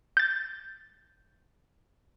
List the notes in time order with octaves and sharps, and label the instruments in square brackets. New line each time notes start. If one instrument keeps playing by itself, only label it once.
[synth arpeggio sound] G6 A6